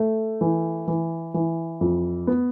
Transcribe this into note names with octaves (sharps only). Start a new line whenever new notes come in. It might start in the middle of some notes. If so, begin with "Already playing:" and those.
Already playing: A3
E3
E3
E3
F2
B3